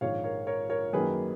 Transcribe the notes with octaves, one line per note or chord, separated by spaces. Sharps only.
A#1 G#2 D#3 C#5 F5
A#4 C#5
A#4 C#5
A#4 C#5
F#2 D#3 F#3 A#3 G#4 B4